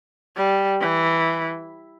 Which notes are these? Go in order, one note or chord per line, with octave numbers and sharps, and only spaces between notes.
G3
E3